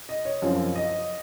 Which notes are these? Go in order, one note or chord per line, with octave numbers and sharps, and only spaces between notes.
D#5
C#5
F#2 F3 C4 F5
F5
F5
D#5